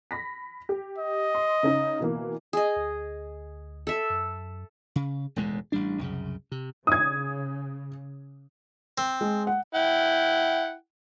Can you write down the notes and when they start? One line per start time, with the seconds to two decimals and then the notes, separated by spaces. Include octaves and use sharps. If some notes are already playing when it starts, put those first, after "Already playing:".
0.11 B5 A#6 B6
0.69 G4
0.98 D#5
1.35 C6
1.63 C#3 C#4 D#4
2.00 B2 E3 A#3
2.53 G#4 D#5
2.76 D2
3.87 A4 E5
4.10 F#2
4.96 C#3
5.36 E1 D#2 A2 G#3
5.72 A1 G3 D4
5.99 C2 F#2 C#3
6.52 C3
6.87 C#3 D#6 G#6
8.98 C4
9.21 G#3
9.47 F#5
9.75 E4 F#5 G5